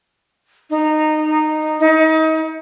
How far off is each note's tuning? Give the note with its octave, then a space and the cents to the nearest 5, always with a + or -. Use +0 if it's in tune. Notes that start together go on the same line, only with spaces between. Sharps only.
D#4 -15
D#4 +30